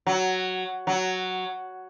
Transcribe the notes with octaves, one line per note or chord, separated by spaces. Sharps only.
F#3
F#3